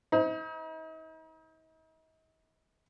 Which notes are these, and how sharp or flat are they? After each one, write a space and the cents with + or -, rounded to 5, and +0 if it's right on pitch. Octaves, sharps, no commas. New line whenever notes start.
D#4 +45 C5 -15